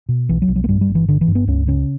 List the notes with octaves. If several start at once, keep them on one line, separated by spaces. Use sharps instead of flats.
B2
B1 E3
F#3
B1
F#3
A#3
G2 G3
G3
G1
E3
G1 D3
E3
G2
B3
C#2 C#4
C#3 C#4